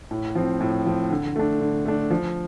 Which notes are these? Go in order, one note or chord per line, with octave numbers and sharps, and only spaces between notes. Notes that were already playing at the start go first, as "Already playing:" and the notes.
A2
F3 C4
A2
F3 C4
D3
A3 D4
D3
A3 D4
F3